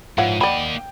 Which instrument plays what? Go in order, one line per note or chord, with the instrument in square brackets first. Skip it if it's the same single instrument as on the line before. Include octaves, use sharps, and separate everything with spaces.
[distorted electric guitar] G#2 [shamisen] E3 F5 F#5 [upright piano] F3 C#5
[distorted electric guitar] A#3 D#5 [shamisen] D5 B5 [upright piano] F#5 G5 G7